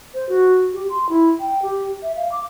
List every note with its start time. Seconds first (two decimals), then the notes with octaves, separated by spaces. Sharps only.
0.14 C5
0.29 F#4
0.74 G4
0.89 C6
1.09 E4
1.40 G5
1.62 G4
2.03 E5
2.16 F5
2.32 D6